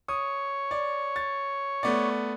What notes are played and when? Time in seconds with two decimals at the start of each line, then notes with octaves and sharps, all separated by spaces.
0.08 C#5 D#6
0.71 D5
1.16 A6
1.83 A3 B3 D5